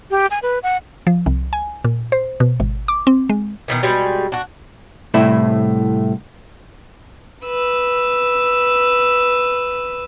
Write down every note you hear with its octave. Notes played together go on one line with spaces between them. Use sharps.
G4
G#5
B4
F#5
F3
C2
G#5
A#2
C5
B2
G#1
D6
C4
G#3
B2 D#3 E3
B2 G3 G#3
D4 F#4
C2 A2 A3 E4
B4 E6